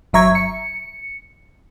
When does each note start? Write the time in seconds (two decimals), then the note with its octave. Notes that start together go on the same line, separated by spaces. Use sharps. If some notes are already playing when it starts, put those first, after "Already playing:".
0.13 G1 F#3 E5 A#5 C#6 G#6
0.35 C#7